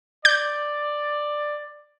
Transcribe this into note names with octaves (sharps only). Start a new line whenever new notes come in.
D5 G6